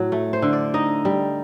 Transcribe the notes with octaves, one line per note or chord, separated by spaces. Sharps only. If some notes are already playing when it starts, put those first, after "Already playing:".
Already playing: A2 F#3
A3
C5
D3
D5
D#4 D#5
G3